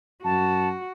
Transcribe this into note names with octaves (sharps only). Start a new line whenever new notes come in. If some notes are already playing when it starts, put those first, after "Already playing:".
F#2 F#4 A5